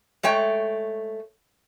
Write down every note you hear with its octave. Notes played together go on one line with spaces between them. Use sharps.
G#3 A3 C#5 G5